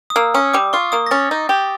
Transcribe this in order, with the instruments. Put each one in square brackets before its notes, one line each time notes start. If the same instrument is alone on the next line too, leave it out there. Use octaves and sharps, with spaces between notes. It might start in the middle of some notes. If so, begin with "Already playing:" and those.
[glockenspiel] D#6
[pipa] A#3 [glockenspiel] E6
[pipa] C#4 [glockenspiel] D#6
[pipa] G3 [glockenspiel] D6
[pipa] F4 [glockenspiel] C#6
[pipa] A#3 [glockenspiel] D#6
[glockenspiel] A#6
[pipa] C#4 [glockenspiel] A6
[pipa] D#4
G4